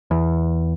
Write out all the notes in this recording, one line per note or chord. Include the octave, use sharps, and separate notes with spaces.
E2